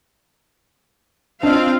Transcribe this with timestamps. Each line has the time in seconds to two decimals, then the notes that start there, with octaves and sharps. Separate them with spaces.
1.43 C4 D4 F4 D#5 F5